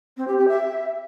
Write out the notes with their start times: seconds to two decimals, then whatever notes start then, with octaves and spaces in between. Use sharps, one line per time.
0.17 C4
0.28 G4
0.38 G4
0.48 E5